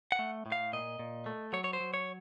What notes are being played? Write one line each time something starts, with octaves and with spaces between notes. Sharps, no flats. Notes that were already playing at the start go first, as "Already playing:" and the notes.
F#5
A3
A2
F5
A#2 D#5
A#2
A3
F#3 C#5
C#5
C5
F#3
C#5